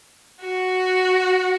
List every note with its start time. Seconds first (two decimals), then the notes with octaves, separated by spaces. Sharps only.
0.41 F#4